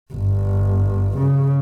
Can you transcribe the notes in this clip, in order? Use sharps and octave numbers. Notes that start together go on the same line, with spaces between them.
G1
C#3